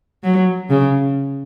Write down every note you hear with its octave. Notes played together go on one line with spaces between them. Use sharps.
F#3
C#3